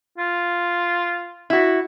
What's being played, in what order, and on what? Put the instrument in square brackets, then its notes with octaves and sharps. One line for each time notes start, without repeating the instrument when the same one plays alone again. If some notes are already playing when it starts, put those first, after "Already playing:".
[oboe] F4
[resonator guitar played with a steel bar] E4 F#4